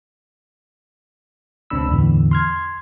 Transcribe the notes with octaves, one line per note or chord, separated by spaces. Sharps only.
C#2 B2 C4 D4 B5 E6
E2 A2 D3 E3
C6 F6 G#6